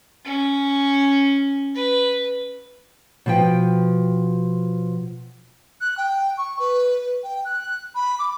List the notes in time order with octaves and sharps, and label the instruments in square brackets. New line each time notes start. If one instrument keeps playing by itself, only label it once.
[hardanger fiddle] C#4
B4
[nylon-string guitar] B2 F3 G5
[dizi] F#6
G5
C#6
B4
G5
F#6
B5
D6